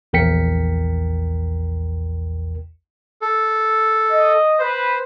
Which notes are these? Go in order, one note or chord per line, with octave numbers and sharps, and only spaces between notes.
A#1 E2 A#4 G5 B6 C#7
A4
D#5
B4 C5